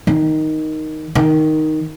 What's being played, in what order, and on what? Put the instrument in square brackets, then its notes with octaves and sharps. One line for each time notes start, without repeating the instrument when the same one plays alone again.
[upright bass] D#3
D#3